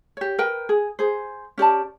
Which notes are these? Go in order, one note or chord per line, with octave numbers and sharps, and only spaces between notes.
G4 C#5
A#4 B4 G5
G#4
G#4 C5
C#4 G4 D5 A5